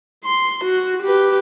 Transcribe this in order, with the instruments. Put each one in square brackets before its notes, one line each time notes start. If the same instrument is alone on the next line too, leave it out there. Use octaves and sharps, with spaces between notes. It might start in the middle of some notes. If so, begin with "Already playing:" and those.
[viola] C6
F#4
G4 B4